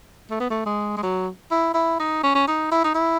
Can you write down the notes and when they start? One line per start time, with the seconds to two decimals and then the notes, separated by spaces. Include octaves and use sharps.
0.30 A3
0.40 B3
0.50 A3
0.66 G#3
0.97 G#3
1.03 F#3
1.51 E4
1.74 E4
2.00 D#4
2.23 C#4
2.35 C#4
2.48 D#4
2.72 E4
2.84 D#4
2.95 E4